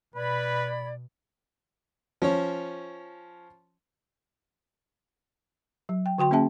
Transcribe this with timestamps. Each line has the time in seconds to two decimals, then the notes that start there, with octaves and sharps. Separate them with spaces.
0.16 B2 B4 D5 B5 G#6
2.22 F3 C#4 C#5
5.89 F#3
6.06 G5
6.18 D3 F#4 G5 C6
6.31 A#3 C#4 G#4 E5 A5